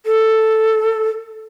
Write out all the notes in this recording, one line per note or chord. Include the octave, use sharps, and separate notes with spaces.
A4